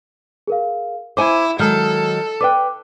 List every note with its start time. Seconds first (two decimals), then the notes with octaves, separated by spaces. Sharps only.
0.47 G#4 A#4 F5
1.17 E4 C5 G#5 D6
1.59 D#3 F#3 G#3 A4 D#6 F6 G6
2.41 B4 D5 G5 D6 F#6